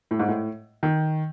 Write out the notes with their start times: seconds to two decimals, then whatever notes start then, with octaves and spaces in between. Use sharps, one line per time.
0.11 A2
0.20 G#2
0.28 A2
0.83 D#3